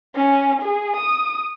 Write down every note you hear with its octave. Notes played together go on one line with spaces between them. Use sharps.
C#4
G#4
D#6